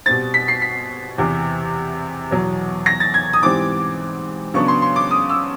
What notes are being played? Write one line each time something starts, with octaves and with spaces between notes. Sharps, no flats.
B2 G3 C4 A6
B6
C7
B6
E2 C3 E3
E2 B2 F#3
A#6
A6
G#6
D#6
G#2 E3 G3 C4 D6
C#3 F#3 B3 D4 C#6
C6
C6
D6
D#6
E6